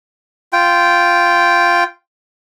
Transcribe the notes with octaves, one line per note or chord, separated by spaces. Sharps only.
F4 G5